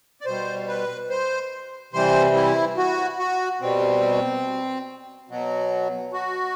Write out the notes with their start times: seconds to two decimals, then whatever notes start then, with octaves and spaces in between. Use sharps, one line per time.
0.21 D5
0.26 B2 G3 C5
0.68 B4
1.10 C5
1.93 C3 E3 G3 C5
2.35 E4
2.77 F#4
3.19 F#4
3.61 B2 G3 C4
5.29 B2 F#3
6.13 F#4